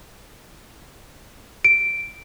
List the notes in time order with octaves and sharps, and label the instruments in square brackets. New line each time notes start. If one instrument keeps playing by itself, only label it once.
[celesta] D7